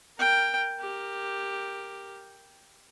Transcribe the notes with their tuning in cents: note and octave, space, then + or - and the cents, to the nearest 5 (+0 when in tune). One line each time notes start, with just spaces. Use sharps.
A#4 +0 G5 +5
G4 +5 A#4 +0